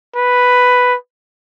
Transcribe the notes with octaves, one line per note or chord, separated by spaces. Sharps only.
B4